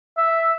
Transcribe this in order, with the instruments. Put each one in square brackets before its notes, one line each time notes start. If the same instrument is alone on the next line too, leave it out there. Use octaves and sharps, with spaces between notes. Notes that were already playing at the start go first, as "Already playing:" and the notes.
[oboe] E5